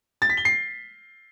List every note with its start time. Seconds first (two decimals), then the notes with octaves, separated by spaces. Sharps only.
0.22 A6
0.30 B6
0.37 G7
0.45 C7